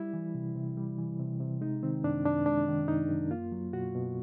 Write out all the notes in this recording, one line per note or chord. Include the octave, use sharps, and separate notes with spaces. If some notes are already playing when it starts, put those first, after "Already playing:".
Already playing: G3 E4
E3
C3
C3
G3
E3
C3
C3
G#3 D#4
D#3 C4
F#2 D4
F#2 D4
G#3 D4
D#3
F#2 D#4
F#2
A#3 F4
F#3
B2 F#4
B2